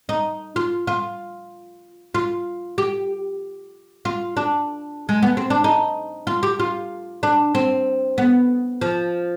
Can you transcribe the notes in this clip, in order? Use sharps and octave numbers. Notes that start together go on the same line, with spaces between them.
D#4
F4
F4
F4
G4
F4
D4
G#3
B3
C4
D4
D#4
F4
G4
F4
D4
C4
B3
F3